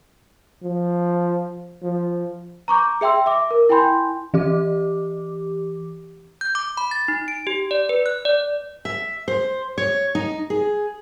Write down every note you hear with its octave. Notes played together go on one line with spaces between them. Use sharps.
F3
F3
A#5 C#6 D6 G6
G#4 E5 G5 C6 E6
E5 D6
A#4
E4 G5 G#5 B5 C6 G6
E3 G4 D6
G6
D6
B5
A6
D#4
D7
G4
D5
B4
F#6
D5
E5
C5
C#5
D#4
G#4